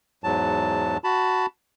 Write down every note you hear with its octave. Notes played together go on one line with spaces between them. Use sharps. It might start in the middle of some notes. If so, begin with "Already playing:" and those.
E2 G#2 F#3 A5
F#4 A5 B5